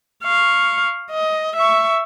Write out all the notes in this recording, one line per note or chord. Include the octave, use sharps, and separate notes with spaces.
F5 C#6
D#5
E5 C#6